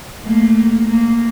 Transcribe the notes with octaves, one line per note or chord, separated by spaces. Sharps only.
A3 A#3
A#3